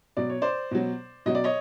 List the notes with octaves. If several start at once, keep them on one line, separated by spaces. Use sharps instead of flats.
B2 F#3 D5
C#5
C5 D5
B2 F#3
B2 F#3 D#5
D5
C#5 D#5